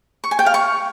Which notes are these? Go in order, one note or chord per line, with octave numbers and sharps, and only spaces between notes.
C#6
G#5
G5
F5
C#6